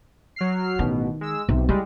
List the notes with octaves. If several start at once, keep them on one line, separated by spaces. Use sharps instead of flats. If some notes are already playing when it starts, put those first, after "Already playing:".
F#3 F6 C7
A1 B2 D#3
G#3 E6
B1 C3
G3 G#3 E4